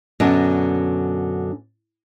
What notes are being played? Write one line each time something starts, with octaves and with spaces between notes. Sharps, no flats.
F#2 B2 D3 D4